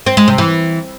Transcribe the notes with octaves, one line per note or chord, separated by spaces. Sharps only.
C4
G#3
C3
E3